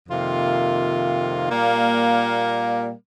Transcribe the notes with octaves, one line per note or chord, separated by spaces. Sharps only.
F2 C3 D#3 A#3 F4
A#2 G3 A#3